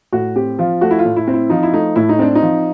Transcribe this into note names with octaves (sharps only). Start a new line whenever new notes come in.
A2 F#4
C4 G4
F3 F4
A3 F#4
E4
F4
A2
E4
C4
E4
F3 D#4
E4
A3 D#4
A2 E4
D#4
C4 D4
D#4
F3